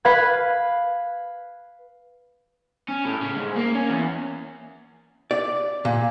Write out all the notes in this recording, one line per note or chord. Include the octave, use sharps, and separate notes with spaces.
B4 F5 B5 G#6
C#4
A2
C#3
G#2
A#3
C#4
E2
D5
A#2